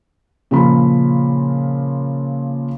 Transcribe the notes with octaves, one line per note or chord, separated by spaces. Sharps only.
A#2 C#3 F3 B5